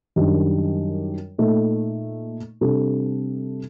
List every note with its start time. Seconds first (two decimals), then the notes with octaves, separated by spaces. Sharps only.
0.16 F#2 D#3 G3 D4
1.38 A#2 A3 D#4 A4
2.61 C3 G3 D4 A4